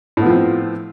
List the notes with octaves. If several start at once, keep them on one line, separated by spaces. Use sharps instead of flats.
A2 F3 B3 C4